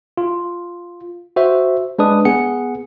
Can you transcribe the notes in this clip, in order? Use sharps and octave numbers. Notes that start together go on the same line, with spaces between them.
F4
F#4 C5 E5
G#3 D4 B4 D#6
B3 G#4 F#5 C#7